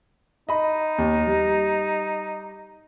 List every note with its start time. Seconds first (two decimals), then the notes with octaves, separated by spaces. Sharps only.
0.49 D#4 D#5 B5
0.98 D#2
1.27 G3